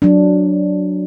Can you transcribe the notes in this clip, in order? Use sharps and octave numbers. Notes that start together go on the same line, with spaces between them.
F#3 D4